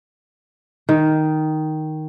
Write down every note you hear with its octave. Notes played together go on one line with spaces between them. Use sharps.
D#3